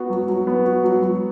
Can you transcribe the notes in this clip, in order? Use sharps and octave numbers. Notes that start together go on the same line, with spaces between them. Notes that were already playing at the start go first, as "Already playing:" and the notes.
Already playing: B3 F#4
F#3
F#3
B3
F#4
F#3
F#3